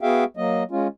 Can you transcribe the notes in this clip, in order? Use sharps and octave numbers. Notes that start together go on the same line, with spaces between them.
B3 F#4 G#4 E5 F5 G5
F#3 A#3 D#5
G#3 C#4 F4